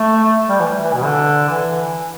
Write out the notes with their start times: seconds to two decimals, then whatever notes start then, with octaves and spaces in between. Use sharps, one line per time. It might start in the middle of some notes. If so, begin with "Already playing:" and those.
Already playing: A3
0.49 G3
0.60 E3
0.83 E3
0.94 B2
1.05 D3
1.50 E3